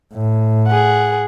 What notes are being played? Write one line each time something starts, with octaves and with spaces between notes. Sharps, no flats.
A2
G#4 F#5